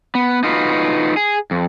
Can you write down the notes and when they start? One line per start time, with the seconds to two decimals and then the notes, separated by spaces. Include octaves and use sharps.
0.15 B3
0.44 D#4 F4 F#4 B4
1.17 G#4
1.51 F2